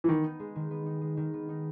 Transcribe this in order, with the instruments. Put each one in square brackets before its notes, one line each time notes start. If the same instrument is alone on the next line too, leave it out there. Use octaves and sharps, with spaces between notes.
[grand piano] E3
[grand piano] D#3 [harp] B3
[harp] D#4
G#3
D#3
B3
D#4
G#3
D#3
B3
D#4